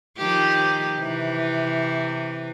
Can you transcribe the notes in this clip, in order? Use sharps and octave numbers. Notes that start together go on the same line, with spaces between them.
D#3 F3 G4
C3 E3